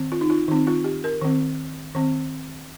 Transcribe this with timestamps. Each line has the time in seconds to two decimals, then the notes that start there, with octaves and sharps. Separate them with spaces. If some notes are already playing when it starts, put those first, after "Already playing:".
Already playing: D#3 C4
0.12 F4
0.21 D#4
0.30 F4
0.48 D#3 C4 D#4
0.67 F4
0.84 G4
1.04 A#4
1.21 D#3 C4
1.95 D#3 C4